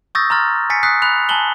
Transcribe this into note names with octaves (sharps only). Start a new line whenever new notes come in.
C#6 D#6 E6 G6 A6 A#6
A#5 C6 F6 A6
G#5 A6 B6 C#7
D#6 F#6 B6 C7
B5 F#6 F7
G#5 A5 F#7 G7